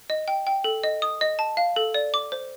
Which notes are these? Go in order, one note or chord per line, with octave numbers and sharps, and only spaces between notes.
D#5
G5
G5
A4
D#5
D#6
D#5
A5
F5
A4
D5
D6
C5